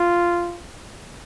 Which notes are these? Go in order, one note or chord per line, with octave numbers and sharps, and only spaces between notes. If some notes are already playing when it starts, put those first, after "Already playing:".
Already playing: F4